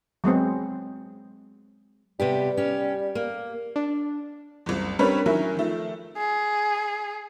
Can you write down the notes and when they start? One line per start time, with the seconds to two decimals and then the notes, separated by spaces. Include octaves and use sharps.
0.24 F#3 G#3 B3 C4
2.20 C3 G3 B3 G4
2.57 C#4 G4
3.15 A#3
3.76 D4
4.66 F#1 C2
4.99 G3 C4 D4 A#4 B4 C#5
5.26 D#3 F#3 C#4 E4 A#4
5.55 D#3 F3 A3
6.17 G#4